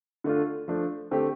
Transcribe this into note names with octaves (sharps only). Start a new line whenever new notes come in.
D3 A3 D4 F4
F3 A3 D4
D3 A3 C4 G4